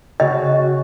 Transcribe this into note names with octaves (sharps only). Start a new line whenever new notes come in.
C#3 F#4 D#5